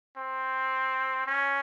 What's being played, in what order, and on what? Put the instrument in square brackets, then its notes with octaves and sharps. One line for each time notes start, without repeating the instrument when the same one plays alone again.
[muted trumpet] C4
C#4